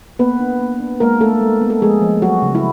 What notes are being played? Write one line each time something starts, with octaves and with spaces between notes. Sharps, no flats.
A#3 B3 B4
D4
A#3
D4
G#3 A#3 A#4
A3 D4 A4
G#3
B3
A4
F3 G#3 G#4
F3
F#3 G#3 F#4
C#3
E4